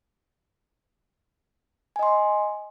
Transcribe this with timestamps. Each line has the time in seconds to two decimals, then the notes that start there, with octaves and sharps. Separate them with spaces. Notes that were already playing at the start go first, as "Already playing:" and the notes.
1.96 G#5
1.99 D#5
2.03 C6